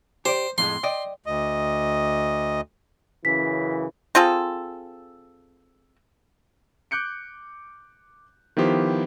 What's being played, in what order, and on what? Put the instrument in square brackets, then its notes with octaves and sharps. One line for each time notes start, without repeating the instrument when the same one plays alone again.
[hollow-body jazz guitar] G4 D5 [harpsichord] C5
[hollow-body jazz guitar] F2 A2 G#3 [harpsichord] C6
[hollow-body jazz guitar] D5 D#5 G5
[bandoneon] D2 D#5
[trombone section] F#2 C#3 E3 [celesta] B6
[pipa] C4 F4 G#4 A4
[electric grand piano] D6 F#6 G6 C#7 D7
D#3 F3 B3 E4 G4 C5